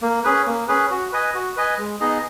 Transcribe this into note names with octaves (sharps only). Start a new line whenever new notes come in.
A#3
C#4 G#4 B4
A#3
C#4 G#4 B4
F#4
B4 D#5 G#5
F#4
B4 D#5 G#5
G#3
B3 D#4 G#4 D#5